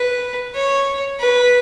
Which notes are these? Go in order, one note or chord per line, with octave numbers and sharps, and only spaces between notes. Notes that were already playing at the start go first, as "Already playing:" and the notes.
Already playing: B4
C#5
B4